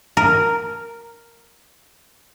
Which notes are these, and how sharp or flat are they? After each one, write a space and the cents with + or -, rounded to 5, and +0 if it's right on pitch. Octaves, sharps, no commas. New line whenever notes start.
A#4 -5